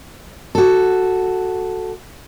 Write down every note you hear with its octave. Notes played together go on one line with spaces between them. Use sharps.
F#4 A4